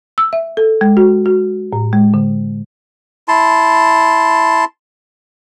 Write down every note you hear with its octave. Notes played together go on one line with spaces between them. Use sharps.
E6
E5
A4
G#3
F#4
F#4
A2
G#3
D3
E4 A5 C6